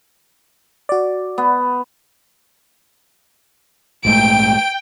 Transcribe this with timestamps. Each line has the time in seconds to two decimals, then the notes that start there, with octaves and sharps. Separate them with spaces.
0.89 F#4 D5
1.38 B3
4.05 A#1 G#2 A3 G5 D7